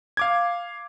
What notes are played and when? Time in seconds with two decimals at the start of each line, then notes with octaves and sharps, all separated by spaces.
0.17 F5 D6 G#6